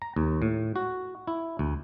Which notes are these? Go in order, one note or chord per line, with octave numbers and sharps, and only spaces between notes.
A#5
D#2
A2
F#4
E4
D2